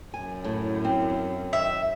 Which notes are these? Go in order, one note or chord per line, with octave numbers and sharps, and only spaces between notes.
F#2 G#5
A2
C4
D#3 E5